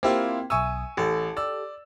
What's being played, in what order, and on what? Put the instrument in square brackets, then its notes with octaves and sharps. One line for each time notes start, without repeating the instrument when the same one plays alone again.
[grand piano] A#3 E4 F4 [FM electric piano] C4 G4 C5
[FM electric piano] B1 E5 D#6 [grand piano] G#5 C#6 E6
[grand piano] A1 [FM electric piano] G4 A4 A5
[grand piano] D5 E6